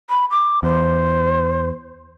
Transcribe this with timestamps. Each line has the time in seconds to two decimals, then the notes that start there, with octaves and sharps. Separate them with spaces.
0.10 B5
0.31 D6
0.63 E2 C5